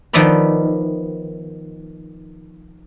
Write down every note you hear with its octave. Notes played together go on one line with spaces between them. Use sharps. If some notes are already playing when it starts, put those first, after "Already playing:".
D#3 F3 B3 D5 E5 B5